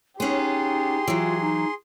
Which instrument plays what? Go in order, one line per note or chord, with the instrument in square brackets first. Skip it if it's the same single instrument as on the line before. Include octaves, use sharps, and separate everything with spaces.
[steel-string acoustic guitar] B3 C#4 [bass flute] D#4 [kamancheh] G4 [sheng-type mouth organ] G#4 C6
[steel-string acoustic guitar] E3 F#3 [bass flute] F4
[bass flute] D#4